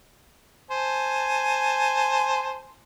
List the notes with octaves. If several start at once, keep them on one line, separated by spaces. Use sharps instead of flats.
C5 G#5 A5